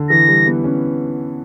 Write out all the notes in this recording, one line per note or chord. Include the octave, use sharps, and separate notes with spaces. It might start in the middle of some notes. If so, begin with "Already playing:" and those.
Already playing: D3
E3 A#6
G3
B3
C#4